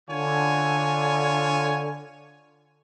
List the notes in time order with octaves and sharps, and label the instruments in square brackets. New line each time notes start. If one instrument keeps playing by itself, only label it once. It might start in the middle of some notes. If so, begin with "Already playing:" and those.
[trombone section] D3 [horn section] F4 C#5 G#5